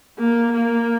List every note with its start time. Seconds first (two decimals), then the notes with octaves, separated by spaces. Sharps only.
0.18 A#3
0.53 A#3